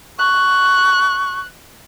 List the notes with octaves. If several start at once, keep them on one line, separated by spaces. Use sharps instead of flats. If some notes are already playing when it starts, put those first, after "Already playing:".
C#6 F#6